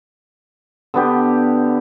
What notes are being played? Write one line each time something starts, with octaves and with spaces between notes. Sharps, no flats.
D3 B3 G4